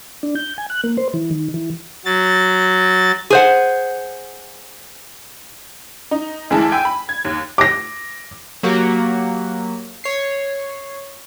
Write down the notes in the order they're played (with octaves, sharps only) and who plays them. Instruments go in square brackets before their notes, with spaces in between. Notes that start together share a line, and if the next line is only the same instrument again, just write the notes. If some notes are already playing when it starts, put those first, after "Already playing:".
[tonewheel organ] D4
G6
G#5
F#6
A#3
C5
E3
D#3
E3
[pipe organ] F#3 A6
[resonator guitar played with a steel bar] G#4 C5 F#5
[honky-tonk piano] D#4
D2 E3 G#3 E4 G#4 A5
G5 G#5 E6
B5
G#6
D#2
[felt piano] D6 A#6
[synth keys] F#3 A#3 F#4 G4
C#5 C7